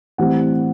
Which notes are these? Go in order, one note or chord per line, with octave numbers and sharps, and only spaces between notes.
A2 E3 G3 C4 F#5